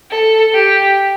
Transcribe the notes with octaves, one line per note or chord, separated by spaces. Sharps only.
A4
G4